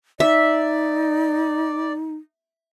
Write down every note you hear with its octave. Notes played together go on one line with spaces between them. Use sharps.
D#4 D5 E5